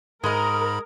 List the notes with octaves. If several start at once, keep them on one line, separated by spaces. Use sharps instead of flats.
G#2 G#3 A#4 D#5 B5